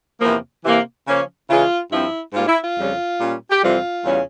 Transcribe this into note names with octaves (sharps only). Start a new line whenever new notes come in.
E2 C3 F3 A#3
C3 E3 A#3
C#3 F3 A#3 C#4
C#3 E3 G#3 C#4 F4
G2 F3 C4 E4
G#2 G3 A#3 F4
E4
F4
F2 C#3 G3 C#4
A#2 G3 C#4
G4
F2 C3 E3 G3 C4 F4
E2 C#3 G3 C#4